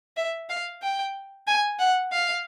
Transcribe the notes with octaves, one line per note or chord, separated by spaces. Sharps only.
E5
F5
G5
G#5
F#5
F5